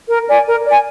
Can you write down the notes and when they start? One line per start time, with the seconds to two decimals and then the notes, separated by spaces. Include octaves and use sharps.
0.08 A#4
0.28 D5 G#5
0.47 A#4
0.65 D5 G#5